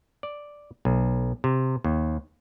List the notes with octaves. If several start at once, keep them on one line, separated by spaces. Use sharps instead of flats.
D5
B1
C3
D#2